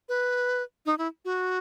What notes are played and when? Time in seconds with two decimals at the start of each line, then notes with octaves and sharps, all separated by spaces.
0.09 B4
0.86 D#4
0.98 E4
1.25 F#4